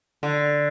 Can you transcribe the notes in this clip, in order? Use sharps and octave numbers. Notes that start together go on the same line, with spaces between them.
D3